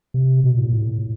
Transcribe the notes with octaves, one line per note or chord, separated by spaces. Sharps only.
C3
B2
A2
A#2
A2